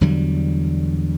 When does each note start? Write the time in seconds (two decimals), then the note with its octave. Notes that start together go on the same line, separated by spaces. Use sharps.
0.01 E2 D3 F#3 G3